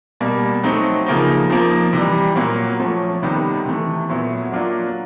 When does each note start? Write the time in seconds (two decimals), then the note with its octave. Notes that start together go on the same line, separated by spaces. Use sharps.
0.21 B2 G3 A#3
0.63 F#3 A3 C4 D#4
1.06 C#3 F3 A#3 D#4
1.50 F3 A#3 D#4
1.93 C3 E3 G3
2.36 A#2 F#3 A#3
2.80 F3 A3 C#4
3.23 C3 D#3 G3 B3 D#4
3.65 C3 E3 A3
4.09 A#2 F#3 B3 E4
4.52 F#3 A#3 D4 F4